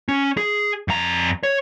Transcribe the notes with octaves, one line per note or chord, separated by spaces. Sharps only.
C#4
G#4
F2 A#5
C#5